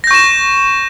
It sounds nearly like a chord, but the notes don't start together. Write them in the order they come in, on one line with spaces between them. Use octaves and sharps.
A#6 G6 C#6 E7